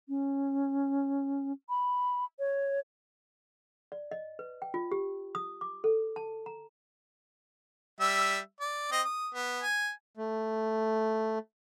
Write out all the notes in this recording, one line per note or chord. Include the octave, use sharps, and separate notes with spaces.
C#4
B5
C#5
D5
D#5
B4
G5
F4
G4
D#6
D6
A4
A5
A#5
G3 E5 E6
D5
C4 D#5
D#6
B3
G#5
A3